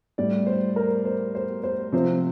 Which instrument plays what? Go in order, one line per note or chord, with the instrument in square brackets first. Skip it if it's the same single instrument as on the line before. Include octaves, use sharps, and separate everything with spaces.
[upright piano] A2 G3 D5
C5
A#4
C5
C5
C5
C3 F3 C5